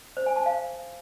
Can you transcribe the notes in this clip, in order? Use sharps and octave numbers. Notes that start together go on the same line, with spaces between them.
C5
G#5
A5
F5